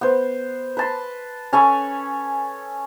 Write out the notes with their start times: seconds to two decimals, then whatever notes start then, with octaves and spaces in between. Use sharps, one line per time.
0.01 B3 C5
0.77 B4 A5 C6
1.53 C#4 A4 G#5 B5